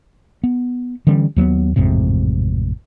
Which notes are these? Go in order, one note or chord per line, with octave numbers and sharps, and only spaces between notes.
B3
D3 E3 G3 C#4
D#2 F#3 A3 B3
A1 F2 G#2 C3